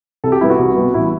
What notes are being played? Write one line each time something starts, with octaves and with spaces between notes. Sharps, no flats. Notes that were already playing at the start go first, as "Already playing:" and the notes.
C2 A4
G4
B2 G3 B3 E4
F#4
C2
B2 G3 B3
A1 E4